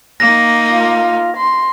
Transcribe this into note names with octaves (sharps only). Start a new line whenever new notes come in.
A#3 D#4 A#6
F4
C6